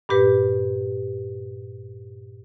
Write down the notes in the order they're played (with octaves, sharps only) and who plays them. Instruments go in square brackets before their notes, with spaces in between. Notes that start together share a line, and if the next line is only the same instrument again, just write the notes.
[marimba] G2 A#2 G4 B4